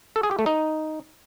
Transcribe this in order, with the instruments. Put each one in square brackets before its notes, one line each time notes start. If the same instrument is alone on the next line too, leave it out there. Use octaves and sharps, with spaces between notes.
[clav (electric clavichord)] A4
G#4
G4
A3
D#4